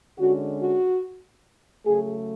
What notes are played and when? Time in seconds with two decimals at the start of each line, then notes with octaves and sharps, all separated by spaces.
0.19 D3 G#3 C#4 F#4
0.61 F#4
1.85 C#3 F#3 A3 G#4